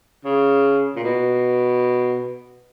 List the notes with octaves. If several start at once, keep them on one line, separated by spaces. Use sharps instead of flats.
C#3
A#2
B2